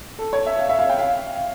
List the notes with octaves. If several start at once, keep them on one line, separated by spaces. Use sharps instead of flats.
A4
C#5
E5
F5
E5
F5
G5
F5